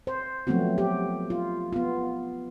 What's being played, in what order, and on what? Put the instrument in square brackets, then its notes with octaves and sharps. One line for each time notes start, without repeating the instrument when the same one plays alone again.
[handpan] C5
F3 F#3 A3 B3 C4 F#4
G4
F4
B3 F4